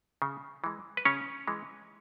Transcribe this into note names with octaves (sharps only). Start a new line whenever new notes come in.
C#3
E3 G#3
B4
C#3 C#4 C#5
E3 G#3